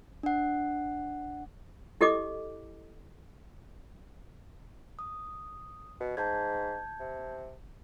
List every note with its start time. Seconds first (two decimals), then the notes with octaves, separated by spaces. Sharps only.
0.23 D4 F#5
2.01 E4 G4 A4 D#5 D6
4.99 D#6
6.00 B2
6.17 G#2 A5 G6 G#6
7.00 C3